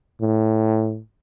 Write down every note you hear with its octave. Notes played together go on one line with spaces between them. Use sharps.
A2